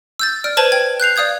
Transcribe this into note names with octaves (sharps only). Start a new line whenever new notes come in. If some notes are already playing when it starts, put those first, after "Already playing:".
E6 G6 A6
D5 F6 D7
B4 C5 A5 G#6 D#7 F#7
G5 G#6
F#6 G6 C7 F7
D5 F5 D#6 G6 G#6